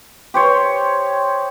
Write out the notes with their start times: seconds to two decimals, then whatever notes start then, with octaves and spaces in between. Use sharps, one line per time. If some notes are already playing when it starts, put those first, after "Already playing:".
0.34 G4 C5 C#5